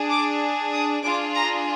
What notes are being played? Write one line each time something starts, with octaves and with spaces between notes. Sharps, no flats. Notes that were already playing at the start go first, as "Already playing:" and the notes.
Already playing: D4 G#4
D6
D#6
D4 F4 G#4 D6
A#5